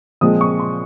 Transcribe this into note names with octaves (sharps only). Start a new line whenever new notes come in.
A#2 F3 G#3 C4 D#6
C#6
C6